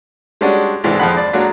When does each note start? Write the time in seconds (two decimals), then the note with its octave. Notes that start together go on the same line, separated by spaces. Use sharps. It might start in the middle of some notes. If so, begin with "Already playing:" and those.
0.41 G3 G#3 C#4 D4 F#4
0.84 C2 G#2 E3 G#3 D4 F4
0.99 F2 F3 G#3 F4 F#5 B5
1.17 D5
1.33 F#3 G#3 A#3 D4 F#4 C#5